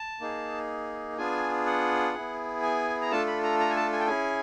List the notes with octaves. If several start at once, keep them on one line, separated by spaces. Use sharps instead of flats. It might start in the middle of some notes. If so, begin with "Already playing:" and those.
Already playing: A5
A#3 D#4 G#4
B3 D4 F4 G#4 G#5
F#5
B3 E4 G#4
G#5
A#5
A3 D4 F4 A4 A5
B5
A#5
A#5
G#5
A5
G#5
G5
C#4 E4 G#4 G#5